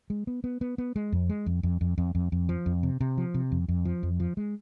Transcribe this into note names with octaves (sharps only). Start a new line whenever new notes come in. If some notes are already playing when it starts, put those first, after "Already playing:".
G#3
B3
B3
B3
B3
G#3
F2
G#3
F2
F2
F2
F2
F2
F2
F3
F2
C3
C3
F3
C3
F2
F2
F3
F2
F3
G#3